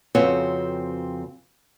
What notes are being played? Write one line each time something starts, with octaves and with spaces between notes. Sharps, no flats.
F2 C#3 C4 F#4 B4 C#5